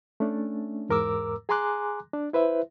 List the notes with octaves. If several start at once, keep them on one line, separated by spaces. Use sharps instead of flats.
A3 C#4 D4
E2 G#2 A#4 A#5 D6 E6
G#4 G#5 A#5 C6 D6 F#6
D4
E4 B4 C5 E5